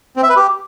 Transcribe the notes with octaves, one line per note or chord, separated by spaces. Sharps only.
C4
E5
B4
G4